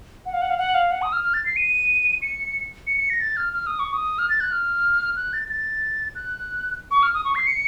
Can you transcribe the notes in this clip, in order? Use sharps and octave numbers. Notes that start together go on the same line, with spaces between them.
F#5
F5
F#5
F5
F#5
F5
F#5
D#6
F6
F6
A6
C7
D#7
C#7
C#7
C#7
A#6
A6
F6
F6
D#6
C#6
D#6
F6
A6
F#6
F6
F#6
A6
A6
F#6
C#6
F6
D#6
C#6
C7
C#7